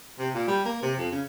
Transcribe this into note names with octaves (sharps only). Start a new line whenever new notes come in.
C3
A#2
G3
A#3
C3
F2
C#3